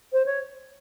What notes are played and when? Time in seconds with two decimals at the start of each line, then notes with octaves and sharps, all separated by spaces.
0.13 C5
0.26 C#5